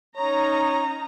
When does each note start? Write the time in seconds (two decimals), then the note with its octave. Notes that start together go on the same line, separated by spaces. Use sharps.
0.17 C#4 D#4 C#5 A#5